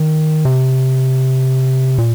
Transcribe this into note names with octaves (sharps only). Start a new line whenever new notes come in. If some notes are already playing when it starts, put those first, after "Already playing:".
Already playing: D#3
C3
A#2